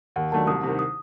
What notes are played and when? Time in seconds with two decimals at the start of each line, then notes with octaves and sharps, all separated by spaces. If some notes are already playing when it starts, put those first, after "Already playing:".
0.16 D#2 F#5
0.32 D#3 F#3 A3 D4 A5
0.47 C2 D#6
0.63 C3 D#3
0.79 D#6